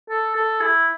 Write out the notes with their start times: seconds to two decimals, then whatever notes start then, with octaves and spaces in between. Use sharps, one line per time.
0.10 A4
0.35 A4
0.61 E4